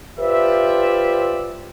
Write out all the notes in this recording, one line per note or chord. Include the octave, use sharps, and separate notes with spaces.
F4 G4 B4 C5 D5 E5